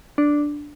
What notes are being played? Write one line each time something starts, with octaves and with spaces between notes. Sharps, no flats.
D4